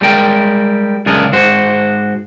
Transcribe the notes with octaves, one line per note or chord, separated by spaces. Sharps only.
G3 G#3 A#4 G5
C#2 F#2 D4 G#4 A#4
G#2 F#4 C5